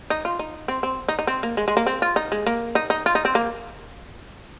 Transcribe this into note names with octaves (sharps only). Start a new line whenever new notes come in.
D#4
F4
D#4
C4
C4
D#4
D#4
C4
A#3
G#3
G#3
A#3
C4
F4
D#4
G#3
A#3
D#4
D#4
F4
D#4
C4
A#3